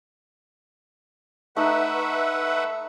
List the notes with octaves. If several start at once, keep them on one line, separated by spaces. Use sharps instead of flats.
A3 D#4 B4 E5 F#5